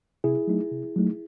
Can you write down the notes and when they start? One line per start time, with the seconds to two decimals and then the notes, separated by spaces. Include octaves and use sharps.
0.24 C3 E4 G#4
0.47 F#3 A3 D#4
0.72 C3
0.96 F#3 A3 D#4